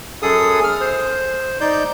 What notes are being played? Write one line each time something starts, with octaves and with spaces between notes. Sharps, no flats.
F#2 G#4 A4 D#6
F6
C5
D#4 D5 G6